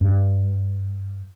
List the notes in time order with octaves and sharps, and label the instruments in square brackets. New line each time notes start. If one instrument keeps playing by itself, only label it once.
[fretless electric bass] G2